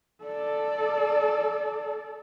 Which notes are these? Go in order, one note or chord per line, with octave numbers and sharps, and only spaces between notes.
A4 D5